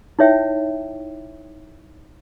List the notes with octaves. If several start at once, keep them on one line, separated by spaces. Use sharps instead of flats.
D#4 E4 C#5 E5 G5